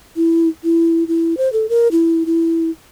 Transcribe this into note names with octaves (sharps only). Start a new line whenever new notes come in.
E4
E4
E4
C5
A4
A#4
E4
E4